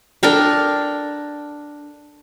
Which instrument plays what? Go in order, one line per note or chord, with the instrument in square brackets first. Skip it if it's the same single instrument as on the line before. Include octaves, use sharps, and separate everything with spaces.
[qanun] D4 A4 A#4 G5